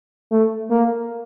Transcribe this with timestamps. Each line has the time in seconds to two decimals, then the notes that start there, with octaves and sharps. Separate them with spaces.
0.31 A3
0.70 A#3